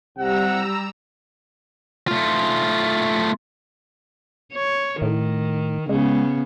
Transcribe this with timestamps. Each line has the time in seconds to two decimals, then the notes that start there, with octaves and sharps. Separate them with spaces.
0.17 C2 C3 G3 F#5 A#5 E6
2.08 A3 F4
4.53 C#5
5.02 A2 D#3
5.89 C#3 G#3 B3